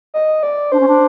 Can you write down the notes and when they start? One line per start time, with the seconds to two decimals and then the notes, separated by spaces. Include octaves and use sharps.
0.14 D#5
0.43 D5
0.72 D4 C5
0.80 C#4
0.88 D4